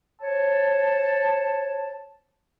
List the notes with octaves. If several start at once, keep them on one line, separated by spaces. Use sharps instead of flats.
C5 C#5 A5